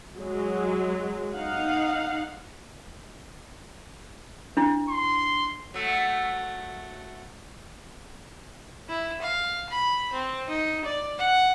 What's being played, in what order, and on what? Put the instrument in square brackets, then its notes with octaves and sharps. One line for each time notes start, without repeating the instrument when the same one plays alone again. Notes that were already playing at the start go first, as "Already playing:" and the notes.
[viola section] F#3 G#3
D#4 F5 F#5
[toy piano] D4 E4
[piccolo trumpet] C6
[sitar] F#3 A3
[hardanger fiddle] E4
F5
B5
C4
D#4
D5
F#5